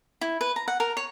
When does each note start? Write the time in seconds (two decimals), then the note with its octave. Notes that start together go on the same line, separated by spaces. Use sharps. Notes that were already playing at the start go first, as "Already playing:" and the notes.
0.21 E4
0.41 B4
0.56 A#5
0.68 F#5
0.80 A#4
0.97 C#5